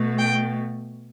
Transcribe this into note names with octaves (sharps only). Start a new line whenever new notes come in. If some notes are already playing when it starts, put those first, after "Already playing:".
Already playing: B2 A3
G5